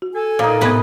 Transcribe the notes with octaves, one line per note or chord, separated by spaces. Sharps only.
F#4
A4 G#5
A#2 D#4 A#4 D5
A2 C3 B3 B4 D#5 G#6